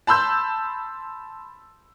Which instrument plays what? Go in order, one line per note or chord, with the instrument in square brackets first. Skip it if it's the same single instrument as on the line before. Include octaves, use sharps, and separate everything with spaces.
[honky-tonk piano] A5 B5 C6 E6 G6